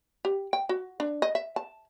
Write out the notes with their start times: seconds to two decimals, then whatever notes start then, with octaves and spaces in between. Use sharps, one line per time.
0.25 G4
0.53 G5
0.69 F#4
1.00 D4
1.22 D#5
1.35 E5
1.56 A5